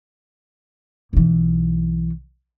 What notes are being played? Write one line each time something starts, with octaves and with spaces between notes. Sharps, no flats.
B1 E3